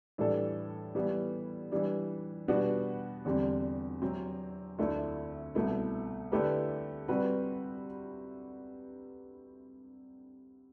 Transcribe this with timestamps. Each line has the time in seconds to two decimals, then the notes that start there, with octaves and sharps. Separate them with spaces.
0.18 A2 E3 G3 D4 A4
0.95 E3 G3 B3
1.72 E3 G3 D4
2.48 B2 G3 B3 D4 F#4
3.25 E2 D3 G3 C4
4.02 C3 F#3 C4
4.79 D2 D3 A3 E4
5.55 C2 B2 A3 E4
6.32 D3 A3 E4 G4 B4
7.08 C3 G3 C4 F#4 B4